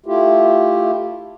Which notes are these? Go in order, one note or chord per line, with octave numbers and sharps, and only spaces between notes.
A3 E4 F4 G4